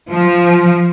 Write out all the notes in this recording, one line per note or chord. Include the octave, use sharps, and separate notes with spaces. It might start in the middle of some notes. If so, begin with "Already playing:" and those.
F3